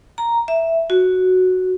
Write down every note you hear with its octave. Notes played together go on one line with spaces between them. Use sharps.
A#5
E5
F#4